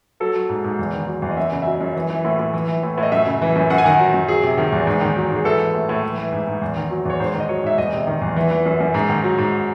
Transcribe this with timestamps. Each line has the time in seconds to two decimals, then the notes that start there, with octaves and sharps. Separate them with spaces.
0.20 F#3 A4
0.35 F#3
0.49 G#2
0.64 G#2
0.79 E2
0.93 D#3
1.08 F#3
1.22 E2
1.31 D#5
1.37 F#2 E5
1.52 C#3
1.62 E5
1.66 F#3 D#5
1.81 F#2
1.96 E3
2.10 E3
2.25 A2
2.39 A2
2.54 E3
2.68 E3
2.83 A2
2.98 A2
3.03 D#5
3.12 F#2 E5
3.26 C#3
3.42 E3
3.56 F#2
3.70 F#2 F#5
3.78 G#5
3.85 D#3 F#5
3.99 F#3
4.14 F#2
4.28 F#3 G#4
4.43 C3
4.57 D#3
4.72 E2
4.87 G#2
5.01 D#3
5.16 F#3
5.31 G#2
5.36 G#4
5.45 E3 A4
5.60 E3
5.74 A2
5.89 A2
6.03 E3
6.18 E3
6.32 G#2
6.47 G#2
6.62 E2
6.76 D#3
6.91 F#3
7.05 E2 C#5
7.20 G#2 C5
7.34 D#3
7.40 D#5
7.49 F#3 C#5
7.64 G#2 E5
7.78 E2 D#5
7.92 C3
8.07 D#3
8.22 E2
8.36 E3
8.51 E3
8.65 F#2
8.80 F#2
8.94 G#2
9.09 D#3
9.24 F#3
9.38 G#2